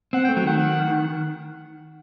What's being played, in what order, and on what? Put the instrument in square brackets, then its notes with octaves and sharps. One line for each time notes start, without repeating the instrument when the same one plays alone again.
[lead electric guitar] C4 [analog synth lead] F#5
[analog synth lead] G5
[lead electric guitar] A3
[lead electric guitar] F#3 [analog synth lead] G5
[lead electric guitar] D#3 [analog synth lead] F#5
[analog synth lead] F#5